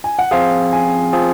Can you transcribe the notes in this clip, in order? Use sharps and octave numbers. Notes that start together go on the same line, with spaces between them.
G#5
F#5
F3 C4 F4 G#4 F5
G#5
F3 C4 F4 G#4